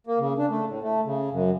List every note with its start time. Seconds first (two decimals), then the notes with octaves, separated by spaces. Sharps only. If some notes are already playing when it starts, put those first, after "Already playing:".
0.07 A#3
0.19 C#3
0.38 D4
0.50 A3
0.67 A2
0.83 A3
1.05 C#3
1.31 F#2